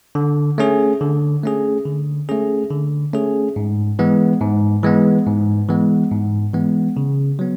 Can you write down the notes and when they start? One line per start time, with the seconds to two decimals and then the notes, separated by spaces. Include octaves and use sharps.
0.15 D3
0.58 A3 C#4 G#4
1.01 D3
1.43 A3 C#4 G#4
1.85 D3
2.29 A3 C#4 G#4
2.70 D3
3.13 A3 C#4 G#4
3.56 G#2
3.99 E3 G#3 B3
4.41 G#2
4.83 E3 G#3 B3
5.26 G#2
5.69 E3 G#3 B3
6.11 G#2
6.53 E3 G#3 B3
6.97 C#3
7.39 F#3 B3